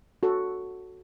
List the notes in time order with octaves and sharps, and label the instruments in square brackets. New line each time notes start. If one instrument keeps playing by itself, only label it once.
[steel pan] F#4 A4